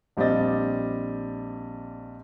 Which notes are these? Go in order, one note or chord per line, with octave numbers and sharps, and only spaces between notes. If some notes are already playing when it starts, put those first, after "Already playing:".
A#1 G3 C4 D5 D#5 A6